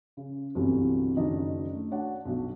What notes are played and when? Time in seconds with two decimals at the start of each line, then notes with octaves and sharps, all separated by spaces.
0.17 C#3
0.55 G1 C2 C3 E3 F#3
1.17 F#1 D#3 F#3 D4 D#4 D#5
1.73 A3
1.91 D4 F#4 C#5 F#5
2.26 B1 F#3